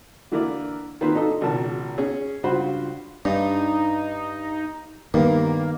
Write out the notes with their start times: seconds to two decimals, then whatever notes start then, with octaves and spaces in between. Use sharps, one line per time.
0.32 D3 E3 A#3 E4 A#4 D5
1.01 D#3 A#3 C4 F4 B4 C5
1.14 D4 D#4 A4 D#5
1.41 G#1 C#2 B2 A#4 A5
1.98 C#4 G#4
2.43 C#2 G2 F4 F#4 C5 B5
3.25 G2 D4 D#4
5.14 G2 D#3 A#3 B3